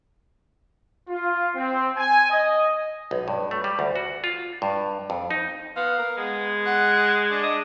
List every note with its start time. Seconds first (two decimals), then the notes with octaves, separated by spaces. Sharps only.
1.08 F4
1.55 C4
1.97 G#5
2.30 D#5
3.11 B1
3.28 G2
3.51 A3
3.64 G3
3.79 D2
3.96 F#4
4.24 F4
4.62 G2
5.10 F2
5.31 D#4
5.76 B3 F5
5.98 A#4
6.17 G#3 B3
6.66 F#5
7.30 D4
7.43 D#5